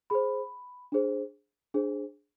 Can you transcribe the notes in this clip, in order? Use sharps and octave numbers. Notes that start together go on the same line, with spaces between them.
G#4 C5 B5
D4 G#4 C5
D4 G#4 C5